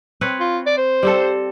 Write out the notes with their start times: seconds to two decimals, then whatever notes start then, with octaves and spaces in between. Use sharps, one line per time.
0.21 C4 B4 C#5
0.40 F4
0.66 D5
0.77 C5
1.03 G3 C4 A4